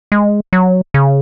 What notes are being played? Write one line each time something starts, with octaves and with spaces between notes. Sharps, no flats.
G#3
F#3
C#3